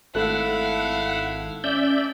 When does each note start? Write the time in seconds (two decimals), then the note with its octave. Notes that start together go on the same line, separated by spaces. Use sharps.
0.15 G#1 A3 E4 A4 F5 F#5
1.64 C#4 D5 E5 G6